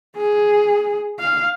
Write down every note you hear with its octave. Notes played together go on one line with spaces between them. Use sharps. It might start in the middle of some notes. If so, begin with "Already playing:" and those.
G#4
F5